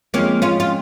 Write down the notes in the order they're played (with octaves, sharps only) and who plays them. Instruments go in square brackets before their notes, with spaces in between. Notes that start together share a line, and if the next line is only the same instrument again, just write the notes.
[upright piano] F2 F3 G#3 [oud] A#3 C#4
[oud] C#4 F4
F4